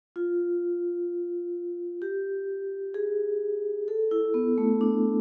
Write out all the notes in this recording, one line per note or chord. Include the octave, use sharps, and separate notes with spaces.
F4
G4
G#4
A4
E4
B3
A3
D4